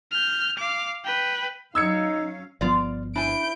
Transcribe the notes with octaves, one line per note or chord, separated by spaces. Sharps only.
F6 G6
F5 D6
B4 G5
F#3 C#4 D#4 F5 E6 G#6 C#7
G1 F3 B3 F4 D5
D4 E4 G#5 G6 D7